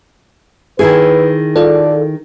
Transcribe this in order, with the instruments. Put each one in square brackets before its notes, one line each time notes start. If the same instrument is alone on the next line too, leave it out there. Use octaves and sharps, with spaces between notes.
[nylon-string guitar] D#3 E4 G#4 [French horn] B4
[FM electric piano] F4 A4 [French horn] D5